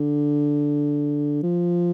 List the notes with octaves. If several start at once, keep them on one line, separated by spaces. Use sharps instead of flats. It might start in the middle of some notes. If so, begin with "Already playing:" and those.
Already playing: D3
F3